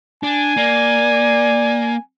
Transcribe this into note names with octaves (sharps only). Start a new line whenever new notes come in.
D4 G#5
A#3 D5